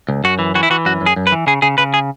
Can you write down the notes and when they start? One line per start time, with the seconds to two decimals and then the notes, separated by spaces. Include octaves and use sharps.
0.09 C#2
0.24 F#2 F#4
0.39 E3
0.55 E3 F#4
0.63 E4
0.70 E3 F#4
0.86 F#2 F#4
1.01 F#2
1.06 G#4
1.16 F#2
1.27 B4
1.32 E3
1.47 C#3 G#4
1.62 C#3 G#4
1.78 C#3 B4
1.94 G#4